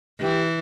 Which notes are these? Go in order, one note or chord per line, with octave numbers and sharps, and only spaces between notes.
E3 G4